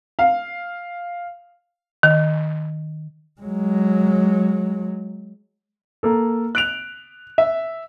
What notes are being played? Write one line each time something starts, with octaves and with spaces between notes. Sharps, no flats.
F5
D#3
F#3 G#3
A#3 A4
F#6 D7 F7
E5